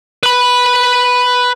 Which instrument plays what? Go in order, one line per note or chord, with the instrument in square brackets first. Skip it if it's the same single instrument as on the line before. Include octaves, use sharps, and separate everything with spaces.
[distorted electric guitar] B4 B5